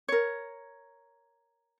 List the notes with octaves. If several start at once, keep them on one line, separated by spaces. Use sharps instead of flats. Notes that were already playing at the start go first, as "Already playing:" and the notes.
A#4 C#5